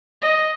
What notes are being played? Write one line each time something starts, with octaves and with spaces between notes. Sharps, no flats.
D#5